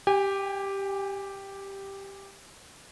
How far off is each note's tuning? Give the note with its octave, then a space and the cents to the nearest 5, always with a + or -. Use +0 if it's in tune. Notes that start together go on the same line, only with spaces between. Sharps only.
G4 +0 G#5 -35